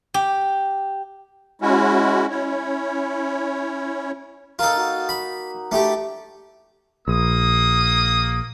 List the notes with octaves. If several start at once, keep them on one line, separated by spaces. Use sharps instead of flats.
G4
G#3 C#4 E4 F#4
C#4 E4 C#5
A#3 D#4 F4 A4
D#4 F#4
B5
A3 D4 E4 G4 D5
A#1 A#3 D#6